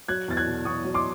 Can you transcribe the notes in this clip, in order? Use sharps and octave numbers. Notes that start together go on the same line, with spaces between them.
F#3 F#6 G#6
E2 A6
F#6 G#6
B2
E2 C#6 D#6
F#3
C6 D6